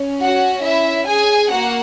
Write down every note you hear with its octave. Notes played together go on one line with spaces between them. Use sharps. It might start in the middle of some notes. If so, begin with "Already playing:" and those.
Already playing: C#4
F#4 F#5
E4 E5
G#4 G#5
A#3 F#4 F#5